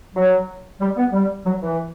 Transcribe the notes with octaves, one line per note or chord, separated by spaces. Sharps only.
F#3
G3
B3
G3
F#3
E3